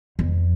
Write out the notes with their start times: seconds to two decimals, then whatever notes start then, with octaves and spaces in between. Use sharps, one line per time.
0.19 F2